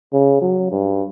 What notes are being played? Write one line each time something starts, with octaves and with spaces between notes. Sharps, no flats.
C#3
F#3
G2